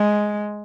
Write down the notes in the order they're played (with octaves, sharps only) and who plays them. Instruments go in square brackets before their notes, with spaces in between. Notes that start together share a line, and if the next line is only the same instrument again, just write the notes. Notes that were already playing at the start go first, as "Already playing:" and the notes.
Already playing: [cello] G#3